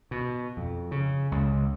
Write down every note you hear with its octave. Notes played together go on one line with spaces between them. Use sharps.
B2
F2
C#3
C#2